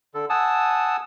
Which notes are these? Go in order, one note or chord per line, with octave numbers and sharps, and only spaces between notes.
D3 A4
F#5 G#5 A5 D#6 E6